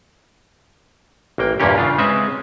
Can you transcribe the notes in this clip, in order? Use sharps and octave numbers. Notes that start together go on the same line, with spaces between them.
A1 A#3 G5
E2 G2 A#2 A#3 C#4 G4
C#3 D4 F4
G#3 C4 C#4 B4 E5